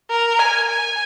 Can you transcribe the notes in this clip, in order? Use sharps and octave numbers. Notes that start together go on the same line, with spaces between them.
A#4
G#5
G#5